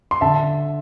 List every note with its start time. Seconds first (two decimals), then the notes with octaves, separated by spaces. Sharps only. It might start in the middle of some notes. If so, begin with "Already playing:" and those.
0.11 C6
0.21 D3 E5 A5